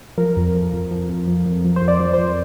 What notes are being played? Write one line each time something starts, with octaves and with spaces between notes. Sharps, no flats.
F3 A#4
F2
F3
F2
F3
F2
F3
F2
F3
C5
F2
D5
F3
F2 C5